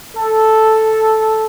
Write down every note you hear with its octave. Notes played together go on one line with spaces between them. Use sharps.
A4